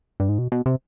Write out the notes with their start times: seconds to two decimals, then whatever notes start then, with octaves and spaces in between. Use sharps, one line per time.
0.20 G2
0.29 G#2
0.39 B2
0.52 B2
0.66 C3